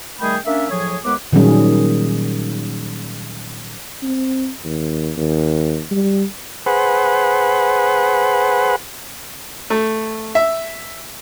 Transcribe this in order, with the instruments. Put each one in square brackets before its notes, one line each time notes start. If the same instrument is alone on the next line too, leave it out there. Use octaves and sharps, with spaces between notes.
[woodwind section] D#3 G3 A3 G#4 G5 B5
A#3 C#4 D4 E5
A2 F3 F#3 G#4 C#5
D#2 G#3 B3 B4 D6
[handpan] A#2 D#3 F#3 G3 C#4 G#4
[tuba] C4
D#2
D#2
G3
[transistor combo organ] G#4 B4 C5 F#5
[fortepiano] A3
E5